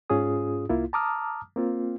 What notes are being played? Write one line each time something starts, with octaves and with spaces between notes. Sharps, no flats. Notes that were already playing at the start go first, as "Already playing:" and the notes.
G#2 C#4 F4 G#4 D#6
C2 A#3 E4 F4
A5 A#5 D6 D#6 F6
A#3 C4 F4